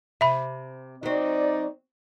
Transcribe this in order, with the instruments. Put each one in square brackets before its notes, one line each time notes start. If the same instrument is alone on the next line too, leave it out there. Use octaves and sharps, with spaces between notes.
[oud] C3 [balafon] E5 B5
[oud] F#3 C4 [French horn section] D#4 D5